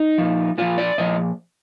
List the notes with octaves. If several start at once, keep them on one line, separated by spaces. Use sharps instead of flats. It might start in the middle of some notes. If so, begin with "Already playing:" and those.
Already playing: D#4
A#2 F3
A#2 F3 F4
D5
A#2 F3 D#5